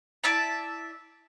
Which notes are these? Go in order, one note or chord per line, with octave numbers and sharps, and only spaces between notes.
E4 D5 E5 A5